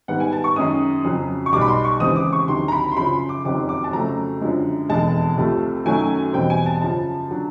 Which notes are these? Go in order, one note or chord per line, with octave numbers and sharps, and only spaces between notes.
G#2 D#3 G3 B3 F#5
G#5
A5
C#6
F#2 D#3 G#3 C#4 D#6
F2 C#3 F#3
C#6
B1 B2 G3 D6
B5
C6
C#6
D#2 C#3 E3 G#3 C4 D#6
D6
C#6
D2 C3 D#3 F#3 C6
A#5
B5
C6
F#2 C#3 F3 B5
C6
D6
F#1 F2 C3 D#3 F#3 D6
D6
A5
F2 C#3 F#3 A3 A#5
F#2 D3 F3 G#3
F1 E2 B2 G#3 A5
C2 C3 F3 A3
F#2 D#3 F#3 A3 C#4 G#5
E2 B2 G3 C4 G5
G#5
A5
F#2 C#3 F3 A5
D3 F#3